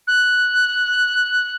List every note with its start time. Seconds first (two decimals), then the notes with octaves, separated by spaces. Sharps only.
0.07 F#6